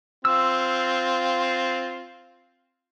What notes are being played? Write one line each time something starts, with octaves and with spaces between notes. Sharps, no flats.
C4 F4 E6